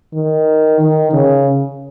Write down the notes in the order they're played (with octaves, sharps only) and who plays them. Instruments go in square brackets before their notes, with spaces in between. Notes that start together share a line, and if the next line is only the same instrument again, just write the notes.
[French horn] D#3
D#3
C#3